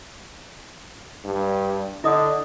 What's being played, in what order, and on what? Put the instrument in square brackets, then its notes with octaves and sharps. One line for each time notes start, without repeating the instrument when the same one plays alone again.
[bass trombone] G2
[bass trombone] D3 [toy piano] E4 D#5 D#6